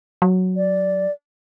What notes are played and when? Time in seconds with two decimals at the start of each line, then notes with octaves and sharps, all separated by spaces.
0.22 F#3
0.56 D5